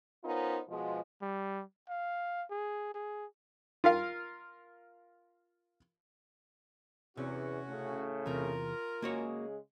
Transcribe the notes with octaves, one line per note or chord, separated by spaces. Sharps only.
B3 C#4 D#4 F4 A#4 C5
B2 F3 G#3
G3
F5
G#4
G#4
F4 A#4 F5
E2 C3 C#4 F#4
A2 C#3 A3
E2 C3 F4 A#4
C#3 G#3 A#3 F#4 G#4 C#5